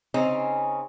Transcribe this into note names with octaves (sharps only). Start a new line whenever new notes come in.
C#3 C4 C#4 D#4